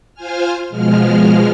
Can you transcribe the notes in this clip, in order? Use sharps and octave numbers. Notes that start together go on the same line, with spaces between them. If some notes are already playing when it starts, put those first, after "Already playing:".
F4 C5 G#5 F6
B2 F3 G#3 F6